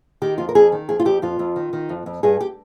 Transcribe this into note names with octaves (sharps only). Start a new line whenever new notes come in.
D#3 G4
F2 F4
A#4
F2 G#4
D#3
F2 G#4
F4
F2 G4
F2 F4
F2
D#3
D#3
F2
F2
G2 G#4
G4